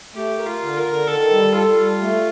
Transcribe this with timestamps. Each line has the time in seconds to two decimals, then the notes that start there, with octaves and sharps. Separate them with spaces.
0.15 A3 G4
0.38 A#4
0.46 F4
0.61 D3
0.77 A#4
0.84 D3
1.07 D#3 A4
1.31 G3
1.54 F4 A4
1.78 G3
2.01 A3